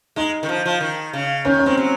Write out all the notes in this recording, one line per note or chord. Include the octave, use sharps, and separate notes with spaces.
G#3 D#4
D#3
F3
F3
D#3
C#3
D#3 C#4
C#4
G#3 C4
F#3